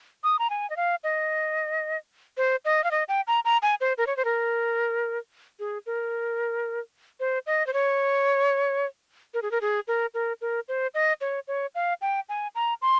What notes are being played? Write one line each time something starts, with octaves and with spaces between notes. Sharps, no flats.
D#6
A#5
G#5
D#5
F5
D#5
C5
D#5
F5
D#5
G5
A#5
A#5
G#5
C5
A#4
C#5
C5
A#4
G#4
A#4
C5
D#5
C5
C#5
A#4
G#4
A#4
G#4
A#4
A#4
A#4
C5
D#5
C#5
C#5
F5
G5
G#5
A#5
C6